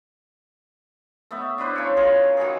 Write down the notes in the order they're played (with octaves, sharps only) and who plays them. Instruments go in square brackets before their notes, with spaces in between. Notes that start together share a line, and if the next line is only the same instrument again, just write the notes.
[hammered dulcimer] A3 B3 E5
D4 E4 B4 C5
C#3 C#5
F4 G#4 A#4
A5
D#3 E3 F#4 G#4